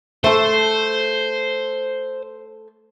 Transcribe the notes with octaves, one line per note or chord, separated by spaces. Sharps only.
A3 A4 C5